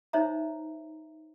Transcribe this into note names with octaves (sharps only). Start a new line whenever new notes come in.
D#4 C5 C#5 E5 A#5